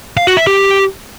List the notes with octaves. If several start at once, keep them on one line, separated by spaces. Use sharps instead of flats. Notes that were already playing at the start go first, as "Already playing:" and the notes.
F5
F#4
E5
G4